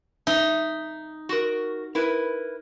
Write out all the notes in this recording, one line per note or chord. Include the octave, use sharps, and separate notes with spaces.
D#4 E5
F#4 A#4
E4 A#4 B4